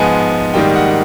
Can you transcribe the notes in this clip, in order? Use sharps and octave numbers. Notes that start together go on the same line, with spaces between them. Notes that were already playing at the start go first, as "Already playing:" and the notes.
Already playing: G#2 F3 G#3 B3 G#5
G#2 D#3 G3 A#3 G5
F#5